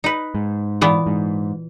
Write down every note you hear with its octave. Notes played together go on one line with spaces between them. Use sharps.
D#4 B4
G#2
A#2 E3 B3
G#2